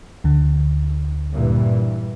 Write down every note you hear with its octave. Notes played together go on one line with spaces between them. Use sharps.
D2 D3
G2 A#2 E3